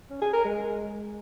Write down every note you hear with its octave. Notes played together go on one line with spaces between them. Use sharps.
C#4
G#4
A#4
G#3